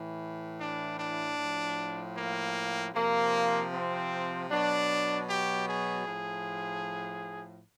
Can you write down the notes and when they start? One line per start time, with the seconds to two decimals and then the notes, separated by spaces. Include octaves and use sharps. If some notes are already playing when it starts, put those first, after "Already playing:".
Already playing: A2 E3
0.59 D4
0.98 D4
1.38 A2 F3
2.15 A#3
2.93 C3 F3 A#3
3.72 C4
4.50 B2 F#3 D4
5.28 G4
5.67 G#4
6.06 A2 F3